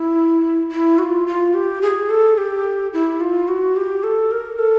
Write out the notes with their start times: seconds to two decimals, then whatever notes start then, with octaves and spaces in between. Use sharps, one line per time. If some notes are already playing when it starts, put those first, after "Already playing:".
Already playing: E4
0.71 E4
0.99 F#4
1.03 F4
1.27 F4
1.54 G4
1.82 G#4
2.10 A4
2.38 G4
2.93 E4
3.20 F4
3.48 F#4
3.76 G4
4.03 A4
4.31 A#4
4.59 A4